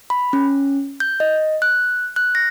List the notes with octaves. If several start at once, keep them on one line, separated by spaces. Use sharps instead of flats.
B5
C#4
G6
D#5
F#6
F#6
A#6